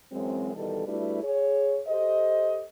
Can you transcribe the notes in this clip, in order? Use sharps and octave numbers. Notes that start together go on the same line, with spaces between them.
F#2 E3 F#3 G#3 C4
B2 D#3 E3 G3 A4
G3 A3 D4 E4 F#4 B4
G#4 C#5
G4 A4 C5 D#5